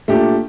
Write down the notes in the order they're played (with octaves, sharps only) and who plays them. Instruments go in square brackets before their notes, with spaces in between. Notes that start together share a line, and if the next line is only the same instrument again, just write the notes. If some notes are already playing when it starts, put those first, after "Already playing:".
[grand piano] A#2 A3 D4 G4